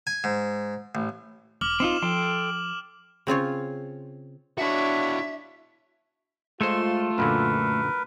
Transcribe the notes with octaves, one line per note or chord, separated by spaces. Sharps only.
G#5
G#2
A1
E1 D6 F6 F#7
C4 D#4 F4 E7
F3 A4 G5 C6
C#3 C4 F4 C#5
D4 E4 F#4 C#5 E5
G#3 A3 F4 A4 C5 C6
F#2 A#2 D3 A#4 B4